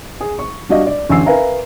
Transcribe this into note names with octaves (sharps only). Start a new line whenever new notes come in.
G#4
C#6
G3 D4 F#4 D5 D#5 F5
D5
A1 D3 G#5 E6 C7
A#4 B4 E5 F5 G#5 A#5